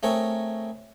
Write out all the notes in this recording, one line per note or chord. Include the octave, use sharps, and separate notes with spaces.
A3 C4 G#4 A#4 C#5